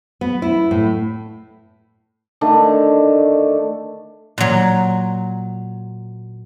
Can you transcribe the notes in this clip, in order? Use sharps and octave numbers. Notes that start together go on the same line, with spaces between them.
B3
E4
A2
D3 D#3 A3 D4
A#2 F#3